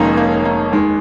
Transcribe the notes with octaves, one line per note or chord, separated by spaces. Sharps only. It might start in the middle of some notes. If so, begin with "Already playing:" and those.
Already playing: F1 F2 D#3 G#3 A#3 C#4 D#4
A#3
A#3
D#2 D#3 G#3